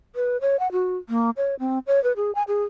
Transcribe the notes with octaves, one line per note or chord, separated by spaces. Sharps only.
B4
C#5
F#5
F#4
A#3
C#5
C4
C#5
B4
G#4
G#5
G#4